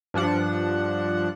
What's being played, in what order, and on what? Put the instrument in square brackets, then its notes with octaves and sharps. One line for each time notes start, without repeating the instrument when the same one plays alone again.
[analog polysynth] G2 F3 D4 F#5